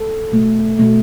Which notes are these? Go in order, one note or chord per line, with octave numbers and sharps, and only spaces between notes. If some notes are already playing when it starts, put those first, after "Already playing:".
Already playing: A4
B2 A3
B2 A3